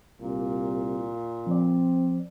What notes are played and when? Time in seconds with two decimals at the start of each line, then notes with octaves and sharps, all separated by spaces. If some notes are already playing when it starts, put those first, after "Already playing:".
0.21 C2 A#2
1.47 F3 C4 D5